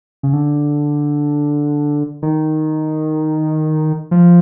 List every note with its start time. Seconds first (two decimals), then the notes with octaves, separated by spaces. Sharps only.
0.23 C#3
0.33 D3
2.22 D#3
4.11 F3